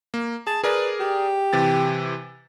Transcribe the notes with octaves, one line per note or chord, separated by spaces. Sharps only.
A#3
G#4 A5
G#4 A#4 B4 D5
G4
C3 E3 A6